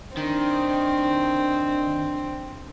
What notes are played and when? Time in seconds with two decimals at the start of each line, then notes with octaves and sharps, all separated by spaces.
0.17 D#3 C4 D4